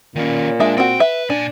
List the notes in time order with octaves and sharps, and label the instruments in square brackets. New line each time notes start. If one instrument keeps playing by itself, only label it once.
[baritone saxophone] A#2 [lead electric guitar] D#3 C#4
[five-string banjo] G#3 E5 [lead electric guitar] D4
[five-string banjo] C4 F#4 [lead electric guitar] G5
[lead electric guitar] B4 [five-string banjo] E5
[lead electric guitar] A#2 G#5 [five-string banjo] D4